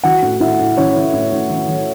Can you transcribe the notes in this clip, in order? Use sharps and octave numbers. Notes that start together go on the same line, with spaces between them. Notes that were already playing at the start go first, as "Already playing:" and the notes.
E3 F#4 F#5
A2
A2 E4 E5
A2
E3 C#4 C#5
E3
A2
A2
E3
E3